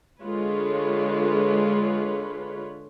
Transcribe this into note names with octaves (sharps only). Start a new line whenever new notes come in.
D3 G#3 F4 B4 C#5